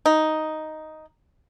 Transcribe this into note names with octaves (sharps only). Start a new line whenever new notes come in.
D#4